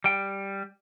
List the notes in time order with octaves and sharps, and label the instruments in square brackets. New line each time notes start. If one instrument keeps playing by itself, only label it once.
[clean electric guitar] G3 G5